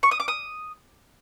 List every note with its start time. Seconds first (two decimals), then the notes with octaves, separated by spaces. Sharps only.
0.03 C#6
0.11 D#6
0.20 D6
0.28 D#6